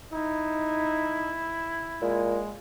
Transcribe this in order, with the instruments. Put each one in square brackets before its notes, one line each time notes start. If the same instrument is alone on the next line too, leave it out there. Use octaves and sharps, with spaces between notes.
[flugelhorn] D#4 [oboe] E4
[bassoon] A#2 [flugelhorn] G#3